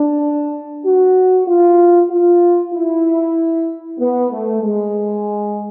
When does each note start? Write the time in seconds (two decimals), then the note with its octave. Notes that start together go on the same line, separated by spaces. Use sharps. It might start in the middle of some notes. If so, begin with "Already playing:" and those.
Already playing: D4
0.85 F#4
1.48 F4
2.10 F4
2.74 E4
3.99 B3
4.32 A3
4.62 G#3